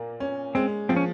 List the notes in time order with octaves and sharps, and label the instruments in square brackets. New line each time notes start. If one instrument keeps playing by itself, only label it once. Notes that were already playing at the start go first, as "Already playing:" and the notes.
Already playing: [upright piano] A#2 A#3
C#4
[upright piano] G#3 [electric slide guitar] C4
[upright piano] F3 [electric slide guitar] C4
[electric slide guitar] C#4